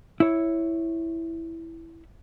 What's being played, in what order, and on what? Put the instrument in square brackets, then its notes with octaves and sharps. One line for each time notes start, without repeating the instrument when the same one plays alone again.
[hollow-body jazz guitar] E4 C#5